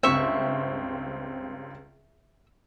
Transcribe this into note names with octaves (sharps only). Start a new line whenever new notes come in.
C#2 G2 C4 E5 C#6